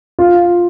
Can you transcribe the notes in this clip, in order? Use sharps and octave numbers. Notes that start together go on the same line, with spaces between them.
F4